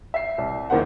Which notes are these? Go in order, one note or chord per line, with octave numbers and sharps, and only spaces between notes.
E5 C7
C2
A#1 E2 D#3 A#3 C5 F#5